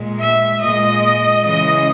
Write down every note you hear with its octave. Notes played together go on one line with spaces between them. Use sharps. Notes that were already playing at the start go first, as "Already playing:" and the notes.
Already playing: A#2 G#3
E5
A#2 G#3 D#5
C#3 E3 G#3 D#5